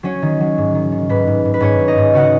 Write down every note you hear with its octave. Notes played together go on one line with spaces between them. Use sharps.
F#3 C#4 C#5
D#3
F#3
G#2
D#3
D#3
G#2 B4
G#2
G#2
B4
G#2 C#4 C#5
G#2
D#4 D#5
G#2
C#3 F#4 F#5